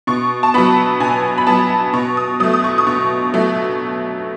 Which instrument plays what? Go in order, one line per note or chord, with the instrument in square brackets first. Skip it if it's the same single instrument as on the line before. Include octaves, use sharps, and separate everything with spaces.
[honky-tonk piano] B2 C#6
A5
F#3 B3 B5
B2 G#5
B5
F#3 B3 A5
B2 C#6
D#6
F#3 A3 D#6
D#6
C#6
D#6
B2 C#6
F#3 A3